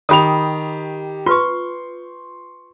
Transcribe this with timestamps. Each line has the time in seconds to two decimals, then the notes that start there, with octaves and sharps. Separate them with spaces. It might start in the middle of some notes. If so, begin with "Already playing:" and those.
0.09 D#3 G4 B5 D#6 F7
1.26 F4 B4 C6 C#6